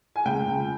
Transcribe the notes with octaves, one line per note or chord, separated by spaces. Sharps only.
G#5
C#2 G5
C#2